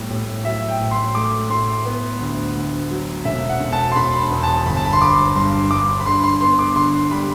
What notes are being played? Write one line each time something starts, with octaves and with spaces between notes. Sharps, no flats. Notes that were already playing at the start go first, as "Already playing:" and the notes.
Already playing: A2 G3 B3
A2
F#3 E5
G5
A1
C6
A3 D6
A2 C6
B3
D2
D2
F#3
E1 E5
F#5
E1
A5
C6
E1 B5
E2
A5
G1 B5
A5
B5
C6
G1 D6
G2 C6
G2 D6
B5
D3 C6
C6
B3 C6
D6
D3 C6
G3 B5